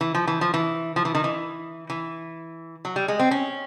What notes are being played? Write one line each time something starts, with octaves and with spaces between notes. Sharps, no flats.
E3
F3
E3
F3
E3
F3
E3
D#3
E3
E3
F#3
G3
G#3
C4
C#4